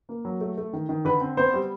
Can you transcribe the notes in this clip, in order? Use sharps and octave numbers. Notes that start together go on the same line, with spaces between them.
A#3
F#3
A3
A3
D#3
D#3
D3 B4
C4
B3 C5
G3